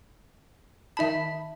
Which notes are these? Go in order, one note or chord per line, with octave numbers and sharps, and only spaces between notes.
D#3 D#4 E5 A5 B5